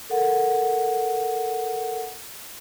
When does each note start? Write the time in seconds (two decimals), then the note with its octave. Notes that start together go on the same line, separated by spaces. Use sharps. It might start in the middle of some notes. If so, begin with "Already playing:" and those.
0.10 A4 A#4 F#5